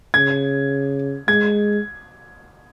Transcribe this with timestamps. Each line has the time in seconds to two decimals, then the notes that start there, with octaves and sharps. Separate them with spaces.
0.14 C#3 G#6
1.28 G#3 G#6